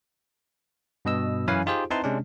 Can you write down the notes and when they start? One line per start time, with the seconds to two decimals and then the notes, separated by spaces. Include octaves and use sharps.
1.05 G2 B2 D#5 E6
1.47 F#2 E3 C#4 B4 F5 G#5
1.66 D#4 F4 G4 G#4 C5
1.90 C4 D#4 E4 B4 A5 C6
2.04 C3 G#3 C#4 D4